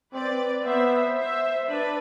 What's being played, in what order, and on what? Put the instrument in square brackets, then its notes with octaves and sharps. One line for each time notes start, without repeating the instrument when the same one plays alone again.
[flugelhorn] C4 [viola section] B4 D5
[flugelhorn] B3 [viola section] C5 E5
[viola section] C5 E5
[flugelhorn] D4 [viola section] B4 D5